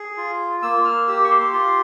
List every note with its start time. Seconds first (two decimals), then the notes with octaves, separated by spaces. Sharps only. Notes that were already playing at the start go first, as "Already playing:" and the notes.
Already playing: G#4
0.17 F4
0.62 A#3 E6
0.85 F6
1.07 G4 E6
1.24 C#6
1.31 C6
1.53 F4 C6